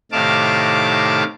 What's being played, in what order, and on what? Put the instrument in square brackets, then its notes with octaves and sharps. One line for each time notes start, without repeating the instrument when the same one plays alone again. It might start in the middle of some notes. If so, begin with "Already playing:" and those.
[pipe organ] A2 C3 D#3 F5 A5 D6